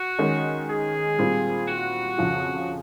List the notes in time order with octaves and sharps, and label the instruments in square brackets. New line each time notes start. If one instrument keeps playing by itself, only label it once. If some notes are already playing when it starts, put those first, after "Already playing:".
Already playing: [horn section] F#4
[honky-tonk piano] D#3 G#3 C#4
[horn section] G#4
[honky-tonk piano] A#2 G3 C4
[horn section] F#4
[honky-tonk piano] F2 C#3 F3